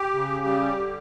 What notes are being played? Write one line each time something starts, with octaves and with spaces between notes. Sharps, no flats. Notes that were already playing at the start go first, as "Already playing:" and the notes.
Already playing: G4
C#3
G3
D3